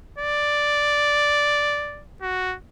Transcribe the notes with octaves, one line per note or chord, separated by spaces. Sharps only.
D5
F#4